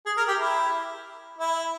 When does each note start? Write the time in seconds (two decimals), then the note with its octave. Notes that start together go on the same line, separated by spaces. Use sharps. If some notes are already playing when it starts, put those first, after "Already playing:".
0.06 G#4
0.17 A#4
0.28 G4
0.39 E4
1.39 E4